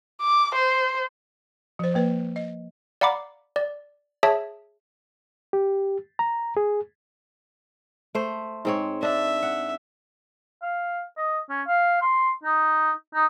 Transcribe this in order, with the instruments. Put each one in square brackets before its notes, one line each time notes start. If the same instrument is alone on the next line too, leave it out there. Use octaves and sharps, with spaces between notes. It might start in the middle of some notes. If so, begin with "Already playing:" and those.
[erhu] D6
C5
[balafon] F3 C5
F3 A#3 B4
D#5
[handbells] D5 F5 F#5 A#5 B5 D6
D5
G#4 C#5 E5 A5
[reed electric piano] G4
A#5
G#4
[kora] A3 C5
G#2 C4 C#5
[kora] D4 [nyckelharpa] E5
[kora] F#5
[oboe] F5
D#5
C#4
F5
C6
D#4
D#4